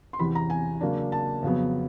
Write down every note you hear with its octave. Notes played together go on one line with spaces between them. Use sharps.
C6
E2 C3 E3 B5
A#5
G#5
C#3 F#3 A#3 D4
A5
F2 C#3 F#3 B3